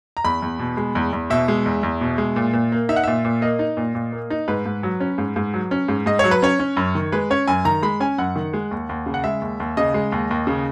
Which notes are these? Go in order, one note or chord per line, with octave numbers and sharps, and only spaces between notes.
A#5
E2 B5
E2
B2
G#3
E2
E2
B2 E5
G#3
E2
E2
B2
G#3
A#2
A#2
A#3
D#4 E5
F#5
A#2 E5
A#2
A#3 D#5
D#4
A#2
A#2
A#3
D#4
G#2 B4
G#2
F#3
C#4
G#2
G#2
F#3
C#4
G#2
G#2 D#5
F#3 C#5
B4
C#4 C#5
C#4
F#2
D#3
G#3 B4
C#4 C#5
F#2 G#5
D#3 A#5
G#3 B5
C#4 G#5
F#2 F#5
D#3
G#3
D#2
D#2
C#3
F#5
G#3 E5
D#2
D#2
C#3 D#5
G#3
D#2
D#2
C#3